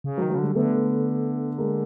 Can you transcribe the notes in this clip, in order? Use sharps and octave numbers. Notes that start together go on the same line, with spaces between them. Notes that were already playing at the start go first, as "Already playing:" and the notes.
C#3
F#3
D#3
C#3 F#3
D3 G3
D3 A3 B3
G#3 A#3